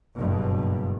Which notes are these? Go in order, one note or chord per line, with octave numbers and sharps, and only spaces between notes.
F#1 G2 B2